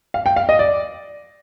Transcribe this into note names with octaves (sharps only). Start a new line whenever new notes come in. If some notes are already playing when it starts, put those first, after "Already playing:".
F5
G5
F5
D#5
D5